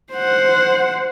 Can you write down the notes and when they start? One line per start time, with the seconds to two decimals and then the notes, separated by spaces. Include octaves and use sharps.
0.13 C5 F#5